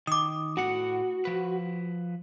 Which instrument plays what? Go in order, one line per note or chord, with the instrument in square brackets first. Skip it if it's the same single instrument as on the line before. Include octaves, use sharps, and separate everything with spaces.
[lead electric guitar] D#3 [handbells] D6 D#6
[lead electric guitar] A2 F#5 [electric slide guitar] F#4
[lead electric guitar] F3 B4